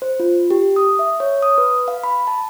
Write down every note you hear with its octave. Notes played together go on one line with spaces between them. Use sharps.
C5
F4
G4
D#6
E5
C#5
D#6
B4
F5
B5
A5